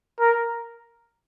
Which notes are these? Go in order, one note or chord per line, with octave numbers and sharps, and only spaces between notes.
A#4